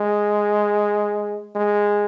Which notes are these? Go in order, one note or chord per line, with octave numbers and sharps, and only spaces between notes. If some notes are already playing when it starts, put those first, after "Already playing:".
Already playing: G#3
G#3